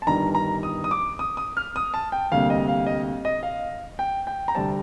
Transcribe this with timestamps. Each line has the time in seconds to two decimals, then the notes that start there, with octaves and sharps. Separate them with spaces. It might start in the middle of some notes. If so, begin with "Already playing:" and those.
0.02 A5
0.07 G1 G2 D#3 G3 A#5
0.35 A#5
0.63 D#6
0.84 D#6
0.91 D6
1.19 D#6
1.37 D#6
1.57 F6
1.76 D#6
1.94 A5
2.12 G5
2.32 D2 C3 G3 A#3 F5
2.50 D#5
2.68 F5
2.87 D#5
3.25 D#5
3.43 F5
3.99 G5
4.27 G5
4.48 A#5
4.55 D2 C3 G3 C4 A5